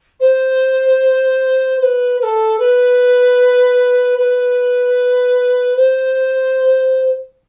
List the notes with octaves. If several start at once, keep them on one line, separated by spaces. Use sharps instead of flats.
C5
C5
B4
B4
A4
B4
B4
C5